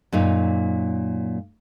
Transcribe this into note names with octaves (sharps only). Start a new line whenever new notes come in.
F#2 A#2 D#4